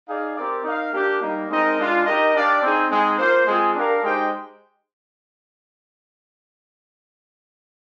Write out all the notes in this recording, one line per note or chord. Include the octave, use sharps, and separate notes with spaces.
D#4 G#4 D5 F5
C4 G4 A#4 D5
D#4 A#4 F5
A#3 D4 G4
G3 A#3 D#4
G#3 C4 D#4 A#4 D#5
G#3 D4 F4
D#4 G4 A#4 D#5
D4 G4 D5 F5
C4 D#4 G#4
G#3 C4 D#4 G#4
A#3 F4 C5
G#3 C4 F4 G#4
D4 G4 A#4 F5
G#3 D#4 G4 C5 G5